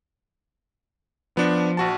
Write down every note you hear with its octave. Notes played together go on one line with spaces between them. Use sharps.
F3 B3 D4
A#1 F#4 A5